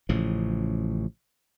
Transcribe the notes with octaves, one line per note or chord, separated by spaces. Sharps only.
A1 A2 C#3 F3